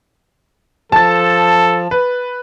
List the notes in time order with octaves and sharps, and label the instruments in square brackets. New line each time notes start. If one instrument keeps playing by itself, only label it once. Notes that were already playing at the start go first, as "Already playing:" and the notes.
[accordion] F3 [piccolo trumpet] A4 [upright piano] A5 A6
[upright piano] B4